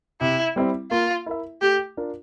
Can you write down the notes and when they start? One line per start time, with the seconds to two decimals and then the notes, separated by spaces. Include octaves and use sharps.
0.21 C3 E4
0.56 G3 C4 E4
0.91 A#3 F4
1.26 E4 A#4 E5
1.62 A3 G4
1.97 D4 F4 A#4